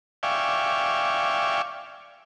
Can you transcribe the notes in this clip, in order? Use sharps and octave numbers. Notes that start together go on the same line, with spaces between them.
D5 E5 F5 G5 G#5 C#6